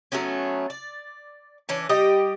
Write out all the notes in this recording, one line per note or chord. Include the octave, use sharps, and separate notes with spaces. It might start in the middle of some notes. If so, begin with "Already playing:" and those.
F#3 A3 B3 C#4
D5
E3 C#4 D4
G3 G4 D#5